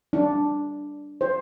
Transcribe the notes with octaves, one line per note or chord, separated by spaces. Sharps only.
D4
C5